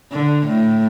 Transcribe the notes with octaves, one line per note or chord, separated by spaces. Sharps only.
D3
A2